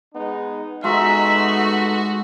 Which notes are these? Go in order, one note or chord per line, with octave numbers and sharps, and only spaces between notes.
G#3 B3 D#4
G#3 A3 B3 D#4 F#4 E5 A#5